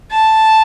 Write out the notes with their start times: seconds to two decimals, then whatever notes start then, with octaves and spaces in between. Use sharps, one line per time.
0.11 A5